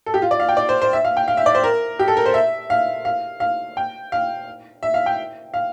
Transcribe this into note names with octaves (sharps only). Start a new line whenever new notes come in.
A4
G4
F4
D5
F5
G5
D5
C5
C5
E5
F5
G5
F5
E5
D5
C5
A#4
G4
A4
A#4
C5
E5
F5
F5
F5
G5
F5
E5
F5
G5
F5